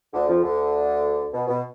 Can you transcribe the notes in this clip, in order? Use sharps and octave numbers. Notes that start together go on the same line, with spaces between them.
D2 D3
F2 F3
D2 D3
B2
B2